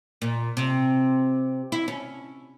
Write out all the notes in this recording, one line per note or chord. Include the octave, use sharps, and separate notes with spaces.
A#2
C3
E4
C#4